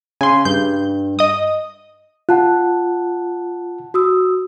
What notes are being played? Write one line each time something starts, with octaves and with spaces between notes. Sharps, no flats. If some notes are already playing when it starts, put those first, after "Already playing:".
C#3 G#5 C6
G2 G6
D#5 D#6
F4 F#5 A5 F#6
F#4 D#6 E6